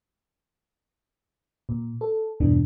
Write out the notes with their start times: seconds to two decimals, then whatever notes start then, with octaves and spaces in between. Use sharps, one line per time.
1.69 A#2
2.01 A4
2.40 E2 G2 B2 E3 B3 D4